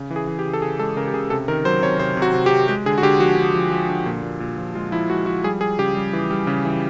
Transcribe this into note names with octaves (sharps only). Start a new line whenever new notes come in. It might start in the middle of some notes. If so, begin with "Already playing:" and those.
Already playing: C#3
E3
G#4
E3
G4
C#3
A4
C#3 G#4
G#3 A4
C#3 A#4
G4
C#3 G#4
C3 A4
D#3 A#4
F#3 C5
C3 C#5
C3 C5
C3
F#4
C3
G4
C3
G#3 G4
D3 G#4
F#4
D3 G4
F3 F#4
D3
F3
F3
D3
A#2
A#2
A#2
F3
G#3 F4
F3 E4
G#3 F#4
F3 F#4
G3 G#4
G3 G#4
C#3 G4
G3
E3
G3
C#3
E3